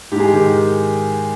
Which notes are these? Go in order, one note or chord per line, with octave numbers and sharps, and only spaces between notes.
G#2 G4
G#4
G4
D#3